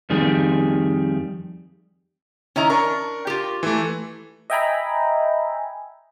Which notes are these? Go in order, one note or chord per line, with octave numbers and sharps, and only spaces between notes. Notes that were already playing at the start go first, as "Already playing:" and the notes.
F2 D#3 G3 G#4
D#3 C#4 E4 A#5
D4 A#4 C#6
F4 G4
E3 A3
D#5 E5 G5 G#5 A#5 B5